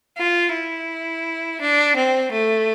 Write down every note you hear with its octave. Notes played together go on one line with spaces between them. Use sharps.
F4
E4
D4
C4
A3